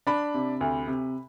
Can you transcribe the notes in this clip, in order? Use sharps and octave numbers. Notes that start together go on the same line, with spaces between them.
D4 B5
C3
D2
C3